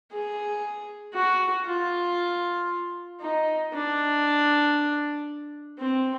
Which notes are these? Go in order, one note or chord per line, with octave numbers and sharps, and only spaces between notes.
G#4
F#4
F4
D#4
D4
C4